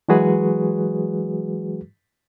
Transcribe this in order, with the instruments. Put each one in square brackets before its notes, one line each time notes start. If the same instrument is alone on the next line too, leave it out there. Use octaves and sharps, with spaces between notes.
[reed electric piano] E3 F#3 G#3 F#4 G#4 B4